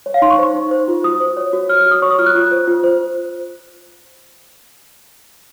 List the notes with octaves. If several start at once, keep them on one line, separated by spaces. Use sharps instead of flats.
C#5
F5
D#4 C6
C#6
C5
D#4
C5
F4
F#4 D#6
C5
C#5
F#4
C#5 F6
F6
F#4
D#6
C#5 C#6
D#6
F4 F6
F#6
F4
C5
F4
C5